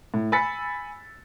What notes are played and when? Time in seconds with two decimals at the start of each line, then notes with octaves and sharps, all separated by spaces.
0.14 A2
0.32 G#5 B5 E6 A6 B6 C#7